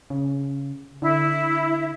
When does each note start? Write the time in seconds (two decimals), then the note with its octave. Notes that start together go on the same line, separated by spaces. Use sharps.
0.10 C#3
1.02 D3 E4